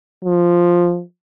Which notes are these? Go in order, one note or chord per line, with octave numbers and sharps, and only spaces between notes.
F3